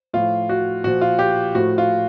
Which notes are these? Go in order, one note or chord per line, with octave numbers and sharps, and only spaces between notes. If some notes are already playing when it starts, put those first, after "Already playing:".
A2 F3 F4
F#4
A#2 F3 F#4
F4
G4
A2 F3 F#4
F4